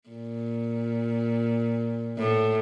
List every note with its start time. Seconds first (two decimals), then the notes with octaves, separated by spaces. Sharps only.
0.09 A#2
2.18 A2